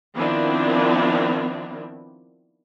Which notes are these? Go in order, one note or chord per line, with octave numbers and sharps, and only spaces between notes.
D#3 F3 B3 C4 D4 E4